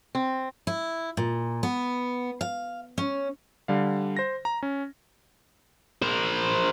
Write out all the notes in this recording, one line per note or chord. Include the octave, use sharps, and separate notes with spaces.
C4
E4
A#2
B3
F5
C#4
D3 G3 F5
C5 A#6
A#5
C#4
A#4 C5